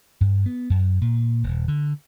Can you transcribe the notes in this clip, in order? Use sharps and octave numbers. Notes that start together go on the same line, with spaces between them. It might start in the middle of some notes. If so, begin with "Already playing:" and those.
G2
B3
F#2
A#2
D#1
D3